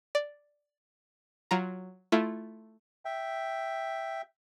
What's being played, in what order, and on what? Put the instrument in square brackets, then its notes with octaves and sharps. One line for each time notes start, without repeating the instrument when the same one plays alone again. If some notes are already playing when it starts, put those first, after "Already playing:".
[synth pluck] D5
F#3 F4 A#5
A3 E4 F4
[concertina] E5 G5